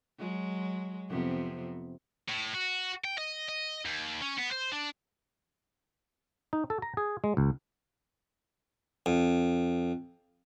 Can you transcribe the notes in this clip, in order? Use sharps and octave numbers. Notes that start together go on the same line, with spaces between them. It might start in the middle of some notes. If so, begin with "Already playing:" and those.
F#3 G#3
F2 C3 B3
A2
F#4
G5
D#5
D#5
D#2
C#4
B3
C5
D4
D#4
A4
A#5
G#4
G#3
C#2
F2